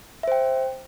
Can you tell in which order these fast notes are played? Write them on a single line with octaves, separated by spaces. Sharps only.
E5 C5 G5